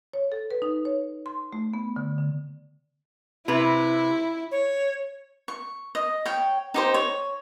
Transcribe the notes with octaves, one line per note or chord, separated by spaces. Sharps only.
C#5
A4
B4
D#4
C#5
C6
A3
B3
D3
D3
C3 E4 B4
C#5
C#6
D#5
C#5 G5
D#4 G4 C5
C#5